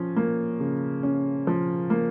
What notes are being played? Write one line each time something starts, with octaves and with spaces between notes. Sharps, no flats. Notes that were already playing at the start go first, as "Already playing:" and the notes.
Already playing: F3 C#4
A#3
C#3
C#4
F3
A#3